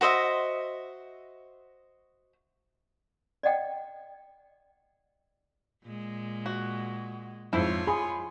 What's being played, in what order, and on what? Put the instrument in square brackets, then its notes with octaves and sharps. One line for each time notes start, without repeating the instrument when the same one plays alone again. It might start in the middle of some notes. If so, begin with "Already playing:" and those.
[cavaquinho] F#4 C5 D#5 E5
[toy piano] D5 D#5 F#5 G5
[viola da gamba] A#2 G#3
[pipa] F#4
[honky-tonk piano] F2 G#2 [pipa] E4 C5 [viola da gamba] F4 C#5
[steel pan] G#4 [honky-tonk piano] B5 C6